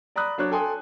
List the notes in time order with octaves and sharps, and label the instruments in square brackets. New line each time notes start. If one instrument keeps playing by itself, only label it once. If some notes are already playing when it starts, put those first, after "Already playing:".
[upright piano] D5 A#5 B5 D#6 F#6
F#3 D4 C#5 F#6
A4 G5 G#5 C6 D#6